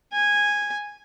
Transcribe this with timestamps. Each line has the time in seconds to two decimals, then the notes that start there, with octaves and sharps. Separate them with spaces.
0.13 G#5